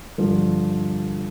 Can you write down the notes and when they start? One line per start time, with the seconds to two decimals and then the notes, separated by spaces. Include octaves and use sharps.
0.18 G2 D3 F3